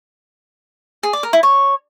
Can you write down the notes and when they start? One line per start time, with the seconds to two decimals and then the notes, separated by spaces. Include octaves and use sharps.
1.03 G#4
1.13 D5
1.23 A#4
1.33 E4
1.43 C#5